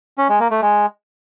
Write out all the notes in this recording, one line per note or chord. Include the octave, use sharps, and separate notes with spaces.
C#4
G#3
A#3
A3
G#3